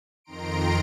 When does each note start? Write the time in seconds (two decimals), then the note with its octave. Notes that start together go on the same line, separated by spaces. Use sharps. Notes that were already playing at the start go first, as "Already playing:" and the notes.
0.24 F2 D#3 A#5 C6 D7